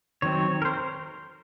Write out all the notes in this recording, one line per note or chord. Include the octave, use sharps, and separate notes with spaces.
D#3 F#3 C4 C#5
A#4
C5